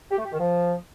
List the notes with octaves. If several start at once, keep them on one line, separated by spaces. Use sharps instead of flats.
G4
A3
G4
D#3
F3